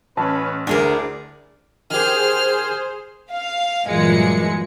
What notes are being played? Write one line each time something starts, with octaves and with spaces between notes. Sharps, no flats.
A1 C#4 B4 A5
D2 D4 E4 G#4 A#4 C5 D5
D#3 G4 G#4 C5 F6
F5
G1 A#2 E3 F#3 G#3 C#7